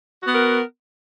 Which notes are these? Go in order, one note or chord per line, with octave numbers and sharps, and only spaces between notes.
B3 F#4 A#4